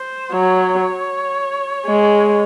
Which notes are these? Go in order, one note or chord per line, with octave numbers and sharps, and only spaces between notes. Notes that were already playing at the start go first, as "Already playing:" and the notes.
Already playing: C5
F#3 C#5
G#3